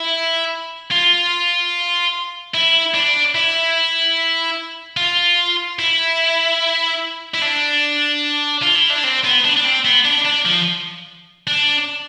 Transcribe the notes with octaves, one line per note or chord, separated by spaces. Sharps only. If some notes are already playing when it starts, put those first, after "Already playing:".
Already playing: E4
F4
E4
D4
E4
F4
E4
E4
D4
F4
E4
D4
C4
B3
D4
D4
C4
B3
D4
D4
F3
D4